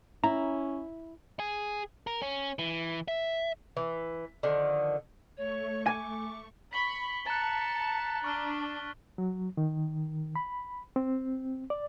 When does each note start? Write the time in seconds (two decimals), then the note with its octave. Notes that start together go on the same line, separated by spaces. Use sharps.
0.24 C#4 E4 A#5
1.39 G#4
2.07 A#4
2.22 C#4
2.59 E3
3.08 E5
3.77 E3
4.43 D3 D#3 F3
5.37 A3 C#5 C#6
5.86 G#5 D6
6.73 B5 C#6 B6 F#7 G7
7.26 A5 A#5 F#6 A6 C#7
8.24 D4 C#6 F6 G7
9.18 F#3
9.57 D#3
10.36 B5
10.96 C4
11.70 D5